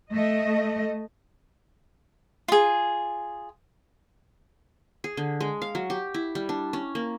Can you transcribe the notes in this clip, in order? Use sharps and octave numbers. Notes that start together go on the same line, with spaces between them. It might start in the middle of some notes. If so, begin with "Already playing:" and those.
A3 D#5
F4 G#4
G#4
D3
G#3
F5
F#3
G4
E4
G3
D4
C#4
A#3